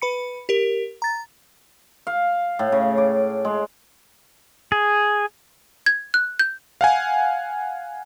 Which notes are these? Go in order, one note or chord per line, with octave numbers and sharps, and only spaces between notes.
B4 B5 C#7
G4 A#4
A#5 A6
F5
A2
C#3
D6
G#3
G#4
G#6
F#6
G6
F5 F#5 G#5